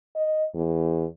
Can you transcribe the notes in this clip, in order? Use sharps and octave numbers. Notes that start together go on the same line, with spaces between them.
D#5
E2